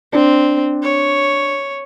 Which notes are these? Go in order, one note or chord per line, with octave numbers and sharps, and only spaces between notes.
C4 D4
C#5